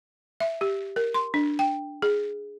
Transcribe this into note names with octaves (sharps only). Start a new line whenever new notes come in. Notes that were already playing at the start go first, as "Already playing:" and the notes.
E5
G4
A#4
C6
D4
G5
G#4